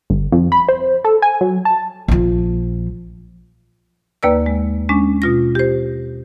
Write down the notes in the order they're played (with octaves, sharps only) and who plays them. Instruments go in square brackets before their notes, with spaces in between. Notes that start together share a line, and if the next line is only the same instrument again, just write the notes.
[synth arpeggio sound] G1
F2
B5
C5
A4
G#5
F#3
A5
[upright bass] A#1 F3
[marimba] D#2 A#3 B4 D5 E6
G#3
G#3 C#4 D4
B2 F4 A#6
G4 C5